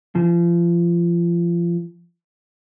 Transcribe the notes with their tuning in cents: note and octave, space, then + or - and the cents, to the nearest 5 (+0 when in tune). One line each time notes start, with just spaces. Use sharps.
F3 -30